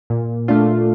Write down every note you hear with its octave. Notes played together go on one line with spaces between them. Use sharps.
A#2
A3 D4 F4